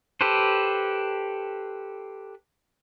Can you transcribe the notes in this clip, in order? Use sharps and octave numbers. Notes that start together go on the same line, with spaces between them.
G4 A4 B4 C5